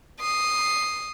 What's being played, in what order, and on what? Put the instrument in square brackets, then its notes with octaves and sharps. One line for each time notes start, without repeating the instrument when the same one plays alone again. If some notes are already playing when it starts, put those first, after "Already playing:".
[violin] D#6 C7